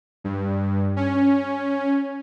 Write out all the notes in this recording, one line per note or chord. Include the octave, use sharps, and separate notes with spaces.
G2
C#4